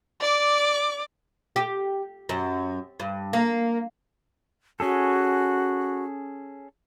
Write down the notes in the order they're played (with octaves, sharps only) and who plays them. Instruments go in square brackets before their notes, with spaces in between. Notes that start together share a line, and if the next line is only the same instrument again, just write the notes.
[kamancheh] D5 D6
[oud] G4
F#2
G2
A#3
[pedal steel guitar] C#4 G#4 A4 [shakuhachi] F#4